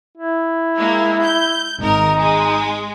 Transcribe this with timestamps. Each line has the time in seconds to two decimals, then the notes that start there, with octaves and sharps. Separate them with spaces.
0.17 E4
0.77 G#3 A#3
1.23 G6
1.79 G#1 D#4 A#4
2.17 G#3